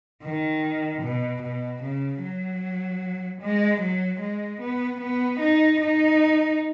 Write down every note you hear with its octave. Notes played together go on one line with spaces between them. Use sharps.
D#3
B2
B2
C#3
F#3
G#3
F#3
G#3
B3
B3
D#4
D#4